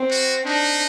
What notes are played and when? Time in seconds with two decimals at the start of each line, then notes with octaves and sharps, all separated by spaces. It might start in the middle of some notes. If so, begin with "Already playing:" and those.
Already playing: C4
0.11 F#4
0.45 D4 D#4